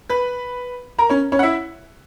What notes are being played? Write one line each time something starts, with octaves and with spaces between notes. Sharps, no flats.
B4 B5
A#4 A#5
C#4 C#5
C#4 C#5
F#5
E4 E5